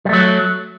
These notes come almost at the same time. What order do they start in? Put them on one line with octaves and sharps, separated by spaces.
G3 A3 F#3